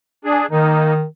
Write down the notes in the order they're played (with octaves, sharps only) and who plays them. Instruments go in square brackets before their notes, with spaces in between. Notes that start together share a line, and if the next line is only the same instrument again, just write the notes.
[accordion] D4 G#4
[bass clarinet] D#3 [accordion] A#3 D#4